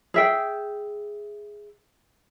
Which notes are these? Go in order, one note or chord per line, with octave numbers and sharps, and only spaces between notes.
G#4 E5 G5